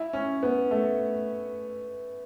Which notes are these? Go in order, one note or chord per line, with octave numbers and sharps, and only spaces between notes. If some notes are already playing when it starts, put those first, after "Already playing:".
Already playing: E4
C#4
B3
A3